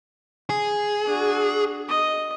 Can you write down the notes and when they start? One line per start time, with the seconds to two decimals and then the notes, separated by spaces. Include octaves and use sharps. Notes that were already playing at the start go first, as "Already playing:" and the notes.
0.50 G#4
1.05 D4 F#4
1.88 D#5